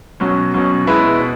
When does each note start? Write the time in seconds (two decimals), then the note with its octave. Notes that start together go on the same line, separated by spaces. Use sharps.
0.20 B2 F#3 C#4
0.54 B2 F#3 C#4
0.86 B2 G#3 E4 B4 E5
1.20 B2